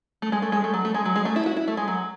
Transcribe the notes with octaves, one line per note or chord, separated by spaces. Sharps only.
A3
G#3
A3
G#3
A3
F#3
A3
G#3
F#3
G#3
A3
E4
F#4
E4
A3
G#3
F#3